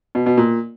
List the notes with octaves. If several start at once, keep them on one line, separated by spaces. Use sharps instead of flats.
B2
B2
A#2